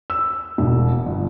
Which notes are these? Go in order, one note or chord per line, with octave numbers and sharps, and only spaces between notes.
E6
E1
G1